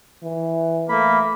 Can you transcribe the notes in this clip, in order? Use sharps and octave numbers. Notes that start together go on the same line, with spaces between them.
E3
A3 A#3 B5